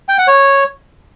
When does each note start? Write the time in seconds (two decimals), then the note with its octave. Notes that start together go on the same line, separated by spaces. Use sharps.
0.09 G5
0.18 F#5
0.28 C#5